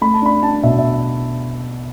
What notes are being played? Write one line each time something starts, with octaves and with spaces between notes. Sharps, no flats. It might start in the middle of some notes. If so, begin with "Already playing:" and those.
A3 B5
A5
D4 B5
D4 A5
B2 E5
E5